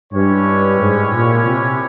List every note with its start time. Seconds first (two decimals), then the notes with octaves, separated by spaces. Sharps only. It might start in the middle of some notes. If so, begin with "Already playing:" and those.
0.13 G2 G#3 C#4 E4 G4 C#5
0.78 G#2
1.11 A#2
1.44 C3